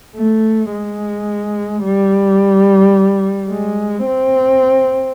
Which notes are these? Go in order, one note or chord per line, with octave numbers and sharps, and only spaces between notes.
A3
G#3
G3
G#3
C4